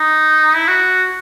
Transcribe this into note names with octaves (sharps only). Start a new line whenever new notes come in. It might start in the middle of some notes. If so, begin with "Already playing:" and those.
Already playing: D#4
E4
F#4